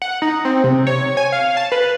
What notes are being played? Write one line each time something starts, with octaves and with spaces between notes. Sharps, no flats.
F#5
D#4
C4
C3
C#5
G#5
F5
A5
B4